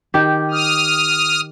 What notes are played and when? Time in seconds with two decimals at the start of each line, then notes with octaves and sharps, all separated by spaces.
0.14 D#3 G4
0.51 D#6 F6